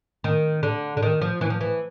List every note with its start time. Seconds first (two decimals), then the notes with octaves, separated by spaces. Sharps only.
0.24 D#3
0.63 D3
0.97 D3
1.03 D#3
1.22 F3
1.41 E3
1.50 F3
1.61 E3